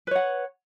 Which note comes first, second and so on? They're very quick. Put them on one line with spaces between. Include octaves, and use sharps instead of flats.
B4 C#5 F#5